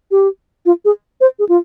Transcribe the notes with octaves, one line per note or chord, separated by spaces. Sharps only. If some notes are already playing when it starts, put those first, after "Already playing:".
G4
F4
G#4
C5
G#4
F4